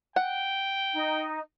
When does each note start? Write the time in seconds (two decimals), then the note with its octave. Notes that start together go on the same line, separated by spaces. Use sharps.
0.16 F#5 G5
0.94 D#4